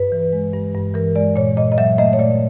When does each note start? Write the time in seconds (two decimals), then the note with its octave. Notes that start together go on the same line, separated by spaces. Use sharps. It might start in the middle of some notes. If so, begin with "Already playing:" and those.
Already playing: G2 B4
0.12 E3
0.33 G#3
0.53 G2
0.74 G2
0.94 E3 A#4
1.16 G#3 D5
1.36 A#2 C#5
1.57 A#2 D#5
1.72 D#5
1.78 F#3 E5
1.98 A3 D#5
2.13 C#5
2.19 A#2 D5